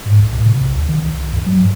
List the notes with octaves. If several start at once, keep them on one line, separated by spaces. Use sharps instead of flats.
G#2
C2
A2
C3
B1
D2
D#3
C2
C2
F#2
F#3
G2